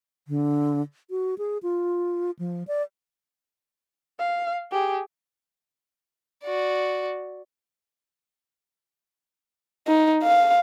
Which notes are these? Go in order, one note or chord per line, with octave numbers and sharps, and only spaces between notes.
D3
F#4
G#4
F4
F3
D5
F5
G4 G#4
F#4 D5
D#4
F5